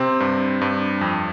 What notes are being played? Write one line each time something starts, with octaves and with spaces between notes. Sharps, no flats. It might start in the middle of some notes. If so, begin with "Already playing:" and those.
Already playing: C3 C4
G2
G2
F2